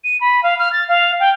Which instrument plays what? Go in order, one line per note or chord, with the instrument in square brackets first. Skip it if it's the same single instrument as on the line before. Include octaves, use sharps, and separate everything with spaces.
[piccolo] D#7
B5
F5
F6
A6
F5
G5